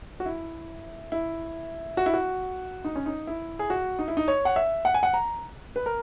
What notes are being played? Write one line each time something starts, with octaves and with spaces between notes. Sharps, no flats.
F#4
E4
E4
F#4
E4
F#4
D#4
C#4
D#4
E4
G#4
F#4
D#4
E4
D#4
C#5
F#5
E5
F#5
G#5
F#5
A#5
B4
A#4